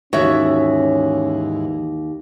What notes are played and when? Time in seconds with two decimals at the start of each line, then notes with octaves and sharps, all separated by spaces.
0.13 D#2 G#2 E3 C#4 F#4 C#5 E5